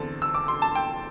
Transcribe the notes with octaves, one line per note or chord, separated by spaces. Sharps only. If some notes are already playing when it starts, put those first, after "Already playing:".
Already playing: E2 D3 C4 A4
E6
D6
C6
A5
G5